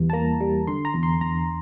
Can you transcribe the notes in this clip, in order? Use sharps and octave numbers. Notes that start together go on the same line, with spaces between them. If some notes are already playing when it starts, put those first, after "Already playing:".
Already playing: E2 E3 G3
A5
A#3 A#5
G3
D3 C6
A#5
E2
C6
E2 A#5